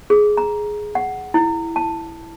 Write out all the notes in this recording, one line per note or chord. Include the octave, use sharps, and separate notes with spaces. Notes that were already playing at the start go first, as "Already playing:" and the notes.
G#4
A#5
F#5
E4
A5